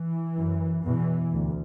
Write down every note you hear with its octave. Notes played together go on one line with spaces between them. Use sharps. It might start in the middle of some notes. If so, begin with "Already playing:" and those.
Already playing: E3
F#2
E2 B2 E3
D2